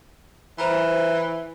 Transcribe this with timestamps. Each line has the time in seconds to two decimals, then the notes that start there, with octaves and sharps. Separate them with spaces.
0.58 E3 C5 A#5 B5